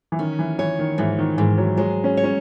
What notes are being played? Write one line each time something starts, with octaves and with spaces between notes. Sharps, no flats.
E3
D#3 C#4
E3
E3 C#5
D#3
G#2 E3
D#3
G#2 E3
F#3
F#3 G#3
C#4
C#5
C#4